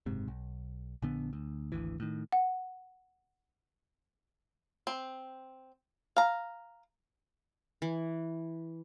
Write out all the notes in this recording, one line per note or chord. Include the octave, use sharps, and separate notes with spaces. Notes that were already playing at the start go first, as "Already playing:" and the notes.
F#1 G#2 C3
B1
A#1 D3 B3
D2
G#1 D2 E3
A2 D#3
F#5
C4
F5 A#5
E3